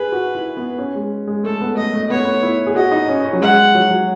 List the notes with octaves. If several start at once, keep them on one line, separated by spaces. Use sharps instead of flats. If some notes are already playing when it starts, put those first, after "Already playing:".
Already playing: G#4 B4
F#4
E4
B3
C#4
G#3
G#3
A3 A4
B3
A3 D#5
A3
B3 C#5
A3
B3
E4
G#4
F#4 D#5
D#4
C#4
C#4
F#3
G#3 F#5
F#3
F#3